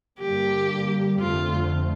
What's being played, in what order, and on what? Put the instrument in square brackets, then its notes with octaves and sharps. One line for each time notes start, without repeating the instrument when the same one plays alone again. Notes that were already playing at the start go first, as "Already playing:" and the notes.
[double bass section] G2 D3 G3 A#3 [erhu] G4
[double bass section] F1 F2 D3 A3 C4 [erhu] F4